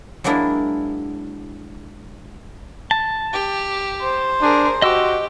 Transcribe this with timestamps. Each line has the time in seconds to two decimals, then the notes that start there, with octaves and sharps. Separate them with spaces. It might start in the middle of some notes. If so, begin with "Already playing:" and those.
0.24 F#3 G#3 A#3 D4 E4
2.91 A5
3.33 G4
4.01 C5
4.42 D4 G#4 A#4
4.82 F#4 G4 D#5 E6